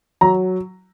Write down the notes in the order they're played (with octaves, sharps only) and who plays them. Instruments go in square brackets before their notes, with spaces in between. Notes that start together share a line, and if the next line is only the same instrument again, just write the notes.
[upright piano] F#3 A#5